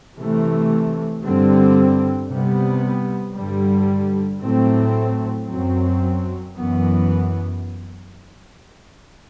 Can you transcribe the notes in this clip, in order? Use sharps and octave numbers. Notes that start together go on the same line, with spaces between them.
C3 E3 A3
G2 D3 G3 C4
C3 G3 B3
G2 D3 G3
A2 F#3 A3 C4
F#2 F#3 C4
F#2 E3 B3